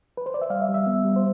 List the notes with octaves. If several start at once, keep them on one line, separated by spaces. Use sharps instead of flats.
B4
C5
D5
E5
G3 F5
E5
G3
E5
B3
G3
C5